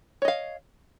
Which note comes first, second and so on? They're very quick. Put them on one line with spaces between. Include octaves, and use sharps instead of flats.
C#5 D#5 F5